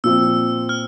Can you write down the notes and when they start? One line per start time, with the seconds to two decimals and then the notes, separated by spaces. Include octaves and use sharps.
0.04 A#2 F3 C4 E6
0.69 F6